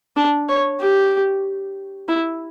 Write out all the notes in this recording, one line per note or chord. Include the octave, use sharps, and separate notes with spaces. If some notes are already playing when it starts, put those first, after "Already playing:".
D4
C#5
G4
E4